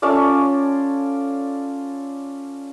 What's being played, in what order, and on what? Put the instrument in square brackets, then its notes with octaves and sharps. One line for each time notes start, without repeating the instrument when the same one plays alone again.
[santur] C#4 F4 A4 D5